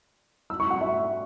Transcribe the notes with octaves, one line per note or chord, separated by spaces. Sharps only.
E6
C#6
F#5
E5